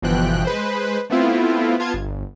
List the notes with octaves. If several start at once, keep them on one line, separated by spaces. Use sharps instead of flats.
G1 B2 E3 F3 G5 F#6
G#3 B4 C5
A3 B3 C4 E4 F4
B3 F4 A5 G#6
G1